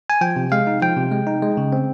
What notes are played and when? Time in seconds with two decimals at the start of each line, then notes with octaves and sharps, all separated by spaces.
0.10 G#5
0.21 F3 G5
0.36 C3
0.52 G#3 F5
0.67 D#4
0.82 F3 G5
0.97 C3
1.11 G#3
1.27 D#4
1.42 G#3
1.57 C#3
1.73 C4